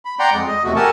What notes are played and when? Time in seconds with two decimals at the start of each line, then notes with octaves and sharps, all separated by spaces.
0.05 B5
0.19 D5 F#5 G5 A#5 C6
0.33 F2 G#3
0.48 D#5
0.64 E2 C3 A3 F#4
0.76 G4 A4 A#4 F#5 G#5 A5